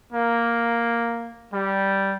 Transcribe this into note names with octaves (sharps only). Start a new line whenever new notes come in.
A#3
G3